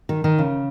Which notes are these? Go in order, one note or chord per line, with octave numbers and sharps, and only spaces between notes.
D#3
D#3
C#3